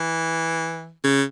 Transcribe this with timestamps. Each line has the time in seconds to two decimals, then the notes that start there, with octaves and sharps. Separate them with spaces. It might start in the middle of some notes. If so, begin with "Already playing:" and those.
Already playing: E3
1.04 C#3